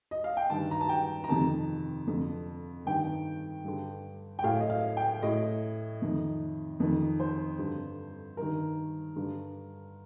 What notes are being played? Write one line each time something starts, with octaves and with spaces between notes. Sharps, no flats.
D#5
F5
G5
G2 D#3 A5
A#5
A5
G5
A#5
F2 C3 D#3 A5
F2 D3
G2 D#3 G5
G2 D3
G5
A2 F5
D#5
F5
G5
A2 D#5
F2 D#3
F2 D#3
C5
G2 D3
G2 D#3 A#4
G2 D3